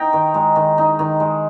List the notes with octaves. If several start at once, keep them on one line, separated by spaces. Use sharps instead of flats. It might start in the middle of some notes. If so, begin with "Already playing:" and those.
Already playing: D#4 G5 A#5
D#3
G#3
D#3
D#4
D#3
G#3